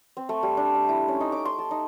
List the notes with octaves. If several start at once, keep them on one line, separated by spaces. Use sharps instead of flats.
C4
A3
G3
D4
G5
E4
C#4
D#4
D6
C6
A4
D#4